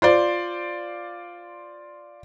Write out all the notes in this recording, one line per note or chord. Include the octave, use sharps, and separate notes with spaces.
F4 C5 D5